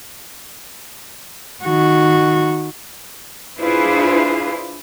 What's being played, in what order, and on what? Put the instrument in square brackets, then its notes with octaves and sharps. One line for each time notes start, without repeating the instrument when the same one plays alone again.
[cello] D#3 F#4
[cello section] D4 E4 F4 G#4 B4 C5